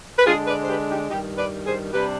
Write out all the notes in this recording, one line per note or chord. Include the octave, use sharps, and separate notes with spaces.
B4
D3 G#3 D4 F4 G#4
B4 D5
C5
G4 B4
D#4 G4
G2 D#3 G3 D#4 G4
B4 D5
G#4 C5
C3 G3 D4 G4 B4